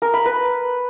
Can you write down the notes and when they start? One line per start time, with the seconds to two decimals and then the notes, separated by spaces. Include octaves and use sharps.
0.02 A#4
0.14 B5
0.25 B4